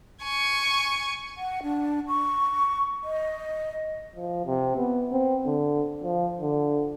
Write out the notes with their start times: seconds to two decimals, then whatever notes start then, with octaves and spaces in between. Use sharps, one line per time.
0.22 G#5 C#6
1.37 F#5
1.63 D4
2.08 C#6
3.04 D#5
4.16 F3
4.46 C3
4.77 B3
5.12 C4
5.46 D3
6.03 F3
6.40 D3